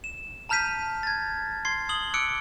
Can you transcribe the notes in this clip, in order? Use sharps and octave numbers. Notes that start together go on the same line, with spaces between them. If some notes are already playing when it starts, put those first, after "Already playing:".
E7
A5 A#5 F6 G6 B6 D#7
G#6 A6
C6 G#6 C7
D#6 F#7 G7
D6 E6 F#6 C#7 D7